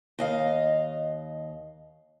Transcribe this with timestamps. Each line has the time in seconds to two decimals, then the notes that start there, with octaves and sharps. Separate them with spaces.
0.19 D#2 D#5 F5